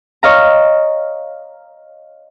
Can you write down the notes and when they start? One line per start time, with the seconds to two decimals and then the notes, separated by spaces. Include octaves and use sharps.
0.23 C#5 D#5 F5 A#5